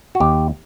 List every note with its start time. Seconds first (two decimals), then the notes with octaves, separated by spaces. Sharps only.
0.15 F#4
0.20 D#2 G4